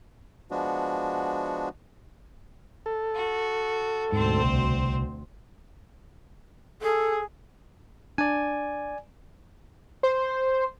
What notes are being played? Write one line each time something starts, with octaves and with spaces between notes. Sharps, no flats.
F3 G#3 B3 D4 F#4
A4
F#4
D2 G#2 B2 C4 C5
C2
G#4 A4
D4 D5 G#5
C5